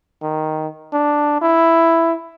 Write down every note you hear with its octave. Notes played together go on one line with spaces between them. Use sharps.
D#3
D4
E4